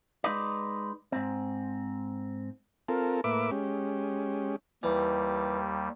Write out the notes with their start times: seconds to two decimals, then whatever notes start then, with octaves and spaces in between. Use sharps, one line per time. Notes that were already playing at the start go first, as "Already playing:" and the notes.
0.24 G#3 D#4 B4 D5
1.12 G#2 C4
2.88 C4 F4 A4 A#4
3.24 A2 A#3 B4 E5 D6
3.51 G#3 C#4 G4
4.83 D#2 E3 G3